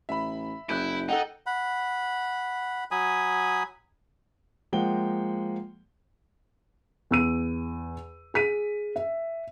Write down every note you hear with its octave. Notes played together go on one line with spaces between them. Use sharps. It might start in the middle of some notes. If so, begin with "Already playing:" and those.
A1 E5 B5
F#1 E4 F#6 G6 D7
D#4 A4 F#5 G5
F#5 B5
F#3 G#5 B5 D#6
F3 G#3 A#3 F#5 G5 G7
E2 E6 D#7
G#4 B6 D#7
E5